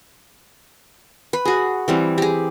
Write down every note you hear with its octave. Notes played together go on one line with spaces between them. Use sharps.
B4
F#4 G#4
E3 G3 C4
G4 G#4